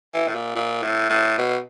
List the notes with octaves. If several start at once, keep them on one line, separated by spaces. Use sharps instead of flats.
E3
A2
A#2
A#2
A2
A2
B2